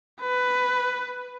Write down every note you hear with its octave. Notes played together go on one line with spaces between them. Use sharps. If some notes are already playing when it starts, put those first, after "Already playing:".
B4